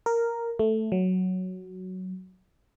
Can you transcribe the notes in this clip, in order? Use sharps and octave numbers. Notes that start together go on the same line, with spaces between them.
A#4
A3
F#3